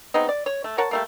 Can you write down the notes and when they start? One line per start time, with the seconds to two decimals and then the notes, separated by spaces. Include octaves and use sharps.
0.14 G#3 B3 C4 D#4
0.29 D5
0.46 C#5
0.64 A3
0.78 A#4 C#5 F#5 A5
0.91 G3 A3 A#3